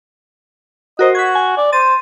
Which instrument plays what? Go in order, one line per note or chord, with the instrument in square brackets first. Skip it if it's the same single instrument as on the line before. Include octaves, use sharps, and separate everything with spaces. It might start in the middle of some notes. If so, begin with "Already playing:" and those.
[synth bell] F#4 A#4 C5 [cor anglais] D#5
[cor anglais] F#4 [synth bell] G#6 B6
[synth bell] G#5
[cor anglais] D5
[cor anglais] C5 [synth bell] A6 D#7